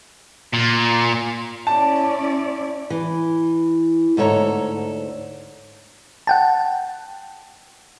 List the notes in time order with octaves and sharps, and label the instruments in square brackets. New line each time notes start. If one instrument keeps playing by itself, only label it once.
[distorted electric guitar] A#2
[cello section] C#4 E4 D5 [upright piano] A5
[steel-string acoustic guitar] E3
D2 G#2 A4 C#5 A#5
[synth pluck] F#5 G5 A5